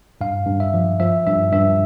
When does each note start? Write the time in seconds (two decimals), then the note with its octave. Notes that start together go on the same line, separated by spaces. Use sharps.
0.21 G2 F5
0.47 G2
0.60 E5
0.74 F3
1.00 F3 E5
1.27 G2 E5
1.52 G2 E5